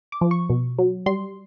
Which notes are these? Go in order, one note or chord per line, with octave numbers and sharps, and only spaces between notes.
D6
F3
C#6
B2
F#3
G3 C6